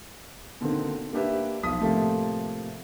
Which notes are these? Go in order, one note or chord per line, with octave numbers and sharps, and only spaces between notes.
B2 D3 D#3 A#3 C4
A#3 D4 G4 B4 E5
B1 F3 D#6 B6
A2 C3 F3 A3 A#3